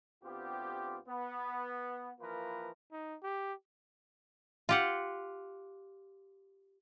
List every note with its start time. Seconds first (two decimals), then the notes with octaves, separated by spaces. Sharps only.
0.24 D2 B3 C4 F4 G4
1.08 B3
2.20 E3 F3 A#3 F4 A#4 B4
2.92 D#4
3.23 G4
4.69 F4 G4 F#5